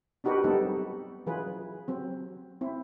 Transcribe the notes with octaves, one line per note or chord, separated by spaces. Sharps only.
D4 D#4 F#4 G4 A#4 B4
F#3 G3 B3 C4 D#4 A4
E3 F#3 F4 G#4 B4
F#3 C4
C4 E4